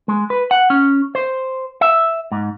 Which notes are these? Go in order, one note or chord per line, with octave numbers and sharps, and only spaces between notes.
G#3
B4
F#5
C#4
C5
E5
G#2